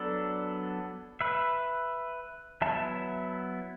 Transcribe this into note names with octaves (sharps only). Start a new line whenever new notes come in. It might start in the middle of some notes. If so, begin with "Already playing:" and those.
Already playing: F#3 B3 D4 A4 D5
B4 E5
F#3 B3 E4 E5 A5